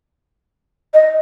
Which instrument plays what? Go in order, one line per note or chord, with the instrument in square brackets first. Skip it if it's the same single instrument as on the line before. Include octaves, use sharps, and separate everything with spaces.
[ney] D#5